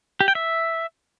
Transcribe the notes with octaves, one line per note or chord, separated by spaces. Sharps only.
G4
G5
E5